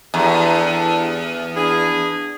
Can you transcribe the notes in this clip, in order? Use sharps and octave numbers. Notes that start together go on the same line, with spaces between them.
E2 D4 G4 A4
B3 D4 G#4